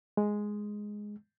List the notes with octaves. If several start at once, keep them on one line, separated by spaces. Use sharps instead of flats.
G#3